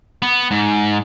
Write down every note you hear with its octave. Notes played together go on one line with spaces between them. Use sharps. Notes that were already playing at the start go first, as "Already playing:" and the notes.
B3
G#2